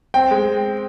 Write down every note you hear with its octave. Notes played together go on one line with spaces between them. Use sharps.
C4 G5
G#3